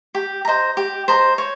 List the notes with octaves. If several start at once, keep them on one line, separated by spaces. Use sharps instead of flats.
G4
C5 D#5 A#5
G4
C5 D#5 A#5
C#5